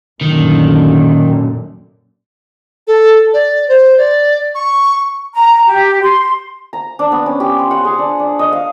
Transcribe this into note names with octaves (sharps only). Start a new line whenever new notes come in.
F#2 A#2 D3 D#3
A4
D5
C5
D5
C#6
A#5
G4
C6
A#5
D4
B3
C#4
G4
C6
F#5
G#4
D4
D4
D#5
F5